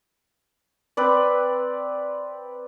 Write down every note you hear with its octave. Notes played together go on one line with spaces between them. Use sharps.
C4 B4 D5